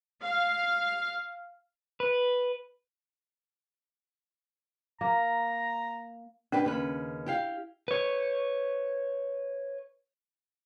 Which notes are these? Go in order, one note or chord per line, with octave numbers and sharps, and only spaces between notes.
F5
B4
A#3 A#5
C#4 D4 G4 B4
D#2 C#3 B4
E4 G4 F5
B4 C#5